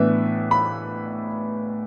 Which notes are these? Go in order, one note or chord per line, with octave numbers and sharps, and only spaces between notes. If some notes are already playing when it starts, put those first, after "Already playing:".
Already playing: A2 E3 B3 D4 E5
B5